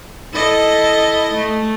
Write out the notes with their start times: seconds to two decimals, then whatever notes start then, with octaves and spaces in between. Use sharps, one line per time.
0.33 E4 A4 D#5
1.34 A3